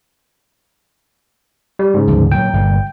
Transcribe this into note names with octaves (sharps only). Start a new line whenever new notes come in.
G3
G#2 C#3
D2 F3 G3
A#2 F#3 G5
G1 A#2